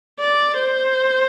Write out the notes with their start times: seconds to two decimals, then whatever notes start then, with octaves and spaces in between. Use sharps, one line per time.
0.20 D5
0.59 C5